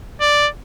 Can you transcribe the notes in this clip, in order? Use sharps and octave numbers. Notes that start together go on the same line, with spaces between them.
D5